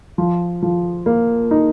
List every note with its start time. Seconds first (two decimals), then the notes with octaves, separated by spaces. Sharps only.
0.18 F3
0.62 F3
1.06 A#3
1.51 D#4